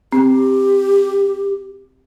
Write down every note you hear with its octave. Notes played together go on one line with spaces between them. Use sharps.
C4 G4